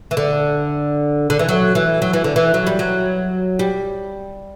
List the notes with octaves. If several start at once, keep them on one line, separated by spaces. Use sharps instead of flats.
E3
D3
D3
E3
F#3
E3
F#3
E3
D3
E3
F#3
G3
F#3
G3